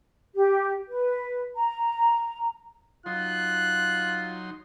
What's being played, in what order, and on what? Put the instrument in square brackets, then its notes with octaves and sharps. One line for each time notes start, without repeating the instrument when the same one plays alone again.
[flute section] G4
B4
A#5
[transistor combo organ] F#3 D#4 C6 [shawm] F4 [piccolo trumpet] F#6